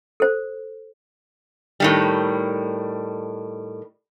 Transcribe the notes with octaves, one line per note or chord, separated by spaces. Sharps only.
A4 C5
A2 D#3 G3